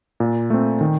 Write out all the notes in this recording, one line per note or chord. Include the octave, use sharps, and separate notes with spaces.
A#2
A3 C4
D#3